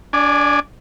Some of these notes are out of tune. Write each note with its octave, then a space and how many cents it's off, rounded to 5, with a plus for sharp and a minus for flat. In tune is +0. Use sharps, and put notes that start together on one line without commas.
D4 -25 D5 +25 G#5 +0